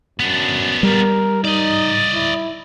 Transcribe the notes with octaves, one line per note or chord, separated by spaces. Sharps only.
F#2 B3 D4
G3 A#4
D#4 D5 D#5
E4